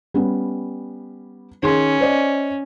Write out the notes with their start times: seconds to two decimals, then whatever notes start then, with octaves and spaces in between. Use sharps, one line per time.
0.14 G3 B3 C#4
1.63 D#3 C#4 G#4 C6
2.01 C5 D5 D#5